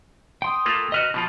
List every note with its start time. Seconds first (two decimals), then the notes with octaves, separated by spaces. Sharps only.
0.42 G5 C6 D#6
0.66 A3 A#3 F4
0.92 F#4 B4 D#5 A#5 F6 F#6
1.14 B2 F3 F4 A5